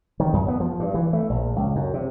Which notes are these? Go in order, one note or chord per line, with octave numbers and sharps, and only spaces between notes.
D#3
F#2
B3
F3
G2
E3
A3
A#1
C#2
F#2
C3